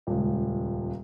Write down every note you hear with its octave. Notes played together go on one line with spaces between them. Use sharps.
D#1 C#2